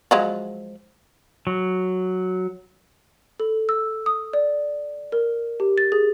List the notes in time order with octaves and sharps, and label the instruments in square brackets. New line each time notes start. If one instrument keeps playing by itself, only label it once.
[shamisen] F3 F#3 G#3
[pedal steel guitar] F#3
[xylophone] A4
E6
D#6
D5
A#4
G4
A6
G#4